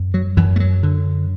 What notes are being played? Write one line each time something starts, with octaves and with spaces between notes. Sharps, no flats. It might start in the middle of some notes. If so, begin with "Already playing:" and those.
Already playing: F#2
F#3
F#2 E3
A3
F#3
D3